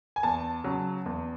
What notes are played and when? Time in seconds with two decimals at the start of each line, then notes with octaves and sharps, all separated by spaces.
0.16 G#5
0.23 E2 A5
0.64 C#3 F#3
1.06 E2